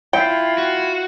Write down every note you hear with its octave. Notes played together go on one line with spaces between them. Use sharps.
E4 F4 G5
F#4